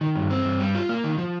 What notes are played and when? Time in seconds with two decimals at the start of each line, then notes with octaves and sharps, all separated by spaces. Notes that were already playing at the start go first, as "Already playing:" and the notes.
0.01 D#3
0.15 G2
0.30 C4
0.45 G2
0.60 G3
0.75 F4
0.89 A#3
1.04 D#3
1.18 F3